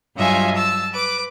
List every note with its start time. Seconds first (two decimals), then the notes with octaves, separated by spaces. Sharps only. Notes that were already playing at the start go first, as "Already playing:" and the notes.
0.15 G2 F#3 F4 D#5 E5 G#5
0.55 A5 E6
0.93 B4 D6